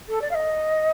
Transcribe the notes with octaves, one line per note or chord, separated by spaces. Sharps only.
A4
D5
F5
D#5